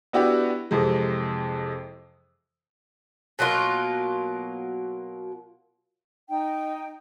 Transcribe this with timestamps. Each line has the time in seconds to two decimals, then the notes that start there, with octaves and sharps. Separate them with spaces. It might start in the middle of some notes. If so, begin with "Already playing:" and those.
0.13 B3 D4 E4 F#4 G4 B4
0.71 F2 C3 E3 G#3
3.39 B2 F#3 A#3 F4
6.29 D#4 G5